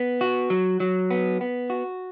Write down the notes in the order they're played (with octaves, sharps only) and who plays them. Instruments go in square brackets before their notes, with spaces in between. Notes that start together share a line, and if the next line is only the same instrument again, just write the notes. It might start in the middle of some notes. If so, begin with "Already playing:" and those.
Already playing: [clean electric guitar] B3
F#4
F#3
F#3
B3
B3
F#4